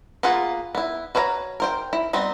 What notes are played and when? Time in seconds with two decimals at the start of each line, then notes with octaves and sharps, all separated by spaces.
0.23 A#3 B3 F4 G#4 F#5
0.75 B3 E4
1.15 F#4 B4 C#5 E5 A#5
1.60 A#4 C5 G5
1.93 E4
2.13 G3 B3 C4 D#4